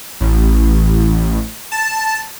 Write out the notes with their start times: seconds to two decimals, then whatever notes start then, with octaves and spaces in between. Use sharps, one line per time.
0.21 A1
1.72 A5